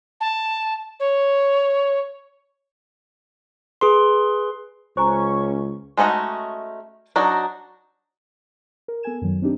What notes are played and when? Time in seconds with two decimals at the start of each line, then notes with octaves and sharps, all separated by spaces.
0.20 A5
0.99 C#5
3.81 G#4 B4 C6
4.97 C#2 C#4 C5 G#5 A#5 C#6
5.97 G#3 A3 C#4 D#4 F#4
7.16 F#3 D4 D#4 F#4
8.88 A#4
9.03 B3 A4 A#4 G#5 G#6 E7
9.21 F#2 D#3 F#3
9.42 C4 D4 D#4 G4